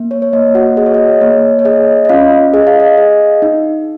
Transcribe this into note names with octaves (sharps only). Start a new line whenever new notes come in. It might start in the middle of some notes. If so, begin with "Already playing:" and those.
Already playing: A#3
C#5
C#5
A#3 D#5
F#4 F#5
G#4 D#5
C#5
D#5
A#3 C#5
C#5
G#4 D#5
D#5
C#4 F4 F5
G#4 D#5
F5
D#5
G#4
D#4